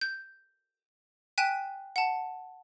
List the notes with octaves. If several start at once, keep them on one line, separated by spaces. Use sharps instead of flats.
G6
G5 G#5 F#6 B6 D#7 E7
F#5 A5